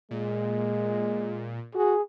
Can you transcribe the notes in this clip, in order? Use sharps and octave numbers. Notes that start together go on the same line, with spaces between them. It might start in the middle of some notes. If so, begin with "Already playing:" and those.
A#2 G#3
F#4 G#4